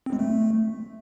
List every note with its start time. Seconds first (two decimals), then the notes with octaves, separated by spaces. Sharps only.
0.06 C4
0.13 G#3
0.19 A3